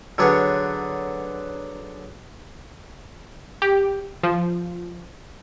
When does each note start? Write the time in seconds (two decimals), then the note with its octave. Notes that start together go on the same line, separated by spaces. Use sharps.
0.18 D3 F#3 B3 D4 G#4 C#5
3.62 G4
4.23 F3